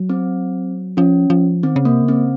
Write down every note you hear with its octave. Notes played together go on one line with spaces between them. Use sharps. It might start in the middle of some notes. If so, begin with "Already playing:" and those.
Already playing: F#3
C4
F3 C#4
F3
D#3 C4
C#3
C3 A#3
C#3
C4